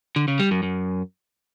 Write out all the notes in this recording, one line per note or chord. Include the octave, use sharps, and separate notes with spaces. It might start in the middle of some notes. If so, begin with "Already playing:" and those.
D3
C#3
G3
F#2
F#2